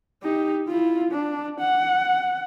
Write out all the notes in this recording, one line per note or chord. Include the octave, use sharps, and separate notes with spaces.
D#4 G4
E4 F4
D4
F#5